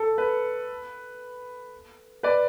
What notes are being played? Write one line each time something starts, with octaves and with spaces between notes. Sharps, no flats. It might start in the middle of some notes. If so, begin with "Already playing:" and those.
Already playing: A4
B4
B4 D5